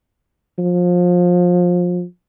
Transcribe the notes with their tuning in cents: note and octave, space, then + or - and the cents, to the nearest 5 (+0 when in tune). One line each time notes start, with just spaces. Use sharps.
F3 +25